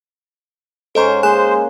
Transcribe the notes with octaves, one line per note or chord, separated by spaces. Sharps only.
G#2 C#4 A4 C5 D#5 A#5 D6
G#3 A#3 C5 G#5 F#6 E7